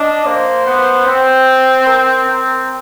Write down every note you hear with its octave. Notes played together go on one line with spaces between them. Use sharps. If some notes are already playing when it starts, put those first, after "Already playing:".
Already playing: D4 D#5
A#3 C5
B3
C4 C5
A#4
C4